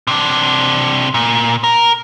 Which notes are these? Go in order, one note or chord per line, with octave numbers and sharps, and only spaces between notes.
C3 D4
A#2
A#4